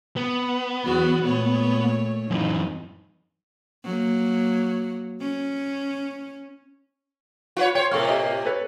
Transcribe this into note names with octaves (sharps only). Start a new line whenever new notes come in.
B3
E2 F#3 F#4
A#2 A3 C#5
F#2 E3 D#4
F#3 A#3
C#4
F4 B4 C#5
C5 C#5 G5
A2 C3 A#3 A4 C#6 F6
G4 D#5
A4 B4 C#5